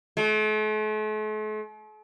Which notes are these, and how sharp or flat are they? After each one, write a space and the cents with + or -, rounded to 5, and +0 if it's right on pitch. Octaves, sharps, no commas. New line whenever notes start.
A3 -45